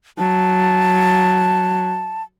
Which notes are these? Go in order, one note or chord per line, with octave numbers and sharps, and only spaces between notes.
F#3 A5